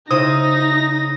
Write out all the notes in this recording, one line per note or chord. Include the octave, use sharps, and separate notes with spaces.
C#3 D#4 E4 C5 D#6 A#6